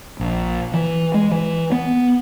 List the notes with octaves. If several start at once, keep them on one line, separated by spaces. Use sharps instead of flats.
A#1
E3
G#3
E3
B3